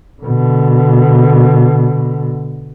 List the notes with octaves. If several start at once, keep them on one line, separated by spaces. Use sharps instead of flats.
B2 D3